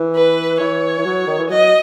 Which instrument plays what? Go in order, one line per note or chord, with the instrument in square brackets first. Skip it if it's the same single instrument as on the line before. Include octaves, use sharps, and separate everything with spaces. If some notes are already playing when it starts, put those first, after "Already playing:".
Already playing: [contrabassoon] E3
[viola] B4
[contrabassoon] E3 [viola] C#5
[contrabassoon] E3
F#3
D#3
E3
[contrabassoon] F#3 [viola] D#5